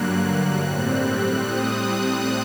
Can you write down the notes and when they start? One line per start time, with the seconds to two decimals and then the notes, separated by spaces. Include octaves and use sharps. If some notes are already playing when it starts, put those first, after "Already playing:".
Already playing: G2 D3 F#3 A#3 F#6
0.59 A2 G3 C4
1.45 D#6
1.74 D#6
2.03 F#6